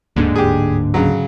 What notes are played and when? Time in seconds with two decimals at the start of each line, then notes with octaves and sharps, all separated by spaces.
0.16 D1 D#2 G#2 D3 A#3 D4
0.36 G4 G#4
0.94 C#3 F#3